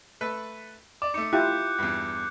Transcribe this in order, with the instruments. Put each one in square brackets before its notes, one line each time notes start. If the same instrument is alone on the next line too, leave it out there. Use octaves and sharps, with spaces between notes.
[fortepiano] A3 A4 B4
[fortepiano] D5 [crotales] D6
[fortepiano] A3 D#4 [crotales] D6 C#7
[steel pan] E4 F4 G4 [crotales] F#6 G6
[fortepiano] E2 G2